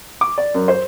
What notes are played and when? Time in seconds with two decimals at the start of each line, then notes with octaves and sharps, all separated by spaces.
0.21 D6
0.38 D5
0.55 F#2
0.68 C5